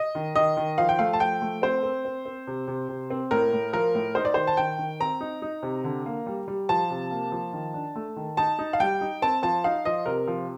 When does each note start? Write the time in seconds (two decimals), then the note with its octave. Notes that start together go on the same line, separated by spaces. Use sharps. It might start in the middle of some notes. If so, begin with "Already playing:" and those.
Already playing: D#5
0.15 D#3
0.35 D#3 D#5
0.57 D#3
0.78 F3 F5
0.89 G5
0.99 A3 F5
1.13 A5
1.20 F3 G5
1.42 A3
1.62 C4 C5
1.83 C4
2.05 C4
2.25 C4
2.47 C3
2.67 C3
2.89 C3
3.10 C4
3.31 A2 A#4
3.53 A2
3.73 F3 A#4
3.95 A2
4.15 D#4 C5
4.25 D5
4.34 D#3 C5
4.47 A5
4.57 D#3 G5
4.78 D#3
5.00 C4 A#5
5.20 D#4
5.42 D#4
5.63 C3
5.84 D3
6.06 A#3
6.26 G3
6.48 G3
6.69 F3 A5
6.90 C3
7.11 A#3
7.32 F3
7.53 D#3
7.74 D4
7.96 A3
8.16 D#3
8.37 D#4 A5
8.59 D#4
8.73 F5
8.80 G3 G5
9.01 D#4
9.22 C4 A5
9.43 F3 A5
9.64 D#4 F5
9.85 F3 D#5
10.06 C3 A#4
10.28 F3